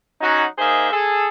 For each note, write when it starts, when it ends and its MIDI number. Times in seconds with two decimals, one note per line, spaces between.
0.21 0.44 54
0.21 0.44 61
0.21 0.44 63
0.21 0.44 66
0.58 0.89 58
0.58 0.89 63
0.58 0.89 68
0.58 0.89 72
0.58 0.89 75
0.58 0.89 76
0.91 1.27 68
0.91 1.27 69